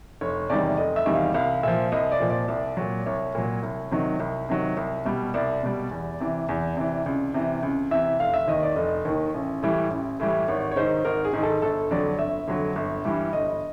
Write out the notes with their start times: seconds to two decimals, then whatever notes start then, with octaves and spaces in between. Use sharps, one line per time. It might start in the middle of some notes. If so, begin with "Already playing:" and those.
0.21 F1 C#5
0.50 E2 C3 D#3 G3 D5
0.77 F1 D#5
0.96 E5
1.06 E2 C3 D#3 G3
1.15 F5
1.34 C2 F5
1.63 A#2 F3 E5
1.92 C2 D#5
2.12 D5
2.20 A#2 F3
2.30 D5
2.48 C2
2.77 A#2 F#3
3.06 C2 C#5
3.35 A#2 F#3
3.62 C2
3.91 C3 D#3 F#3
4.20 C2
4.49 C3 D#3 F#3
4.77 C2
5.05 B2 G3
5.34 C2 D5
5.63 B2 G3
5.91 E2
6.20 C3 E3
6.49 E2
6.77 C3 E3
7.06 C#2
7.34 C3 E3
7.63 C#2
7.91 C3 E3 E5
8.20 F1 F5
8.34 E5
8.48 D#2 D#3 D#5
8.63 D5
8.76 F1 D#5
9.05 D#2 D#3
9.34 A1
9.62 A2 E3 G3
9.90 A1
10.20 A2 E3 G3
10.48 G#1 C#5
10.71 C#5
10.76 G#2 D#3 C5
11.05 G#1 A#4
11.25 G#4
11.33 G#2 D#3
11.43 A4
11.62 G1 A4
11.91 F2 D3 F#3 D5
12.18 G1 E5
12.47 F2 D3 F#3
12.76 G1
13.05 G2 E3 G3
13.33 G1 D#5